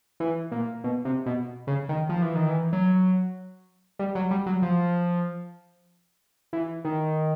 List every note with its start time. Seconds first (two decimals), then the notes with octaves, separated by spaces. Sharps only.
0.20 E3
0.52 A#2
0.84 B2
1.05 C3
1.26 B2
1.67 C#3
1.89 D#3
2.09 F3
2.22 E3
2.35 D#3
2.49 E3
2.73 F#3
3.99 G3
4.15 F#3
4.31 G3
4.46 F#3
4.62 F3
6.53 E3
6.85 D#3